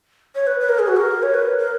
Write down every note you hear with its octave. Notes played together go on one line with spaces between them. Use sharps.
C#5
B4
B4
A#4
G#4
F#4
A#4
C#5
B4
A#4